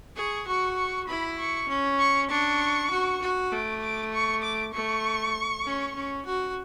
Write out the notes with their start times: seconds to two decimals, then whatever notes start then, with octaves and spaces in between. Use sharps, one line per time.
0.16 G#4 C#6
0.46 F#4 C#6
0.77 C#6
1.08 E4 B5
1.38 C#6
1.68 C#4
1.99 C#6
2.30 D4 C#6
2.90 F#4
3.22 F#4
3.52 A3 D6
3.82 D6
4.12 C#6
4.43 D6
4.73 A3 C#6
5.65 C#4
5.95 C#4
6.25 F#4